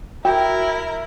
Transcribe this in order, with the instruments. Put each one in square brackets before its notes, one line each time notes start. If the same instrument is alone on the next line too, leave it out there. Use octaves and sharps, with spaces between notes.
[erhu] E4 [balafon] F#4 [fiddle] A#4 [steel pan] G5